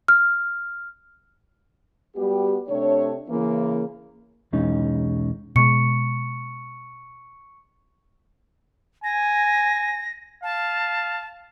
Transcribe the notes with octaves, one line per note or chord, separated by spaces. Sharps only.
F6
G3 B3 F#4 G4
C3 A3 D4 C#5
C#3 E3 A#3
B1 E2 G#3 C#4 D#4
B2 G#3 C#6 C#7
G#5 A#6
F5 A5